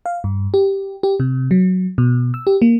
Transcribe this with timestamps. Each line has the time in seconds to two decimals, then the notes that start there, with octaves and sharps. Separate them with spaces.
0.06 F5
0.24 G2
0.54 G4
1.03 G4
1.20 C3
1.51 F#3
1.98 B2
2.34 E6
2.47 G4
2.62 A#3